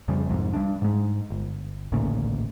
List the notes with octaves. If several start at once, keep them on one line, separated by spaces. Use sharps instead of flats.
F2 C#3 G3
C2 F2 G#2
G3 D4
G#2 G#3
G1
A1 D2 A#2 C#3